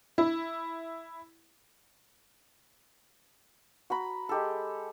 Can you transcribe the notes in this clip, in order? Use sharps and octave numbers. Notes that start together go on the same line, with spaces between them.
E4
F#4 A#5 B5
G#3 G4 A4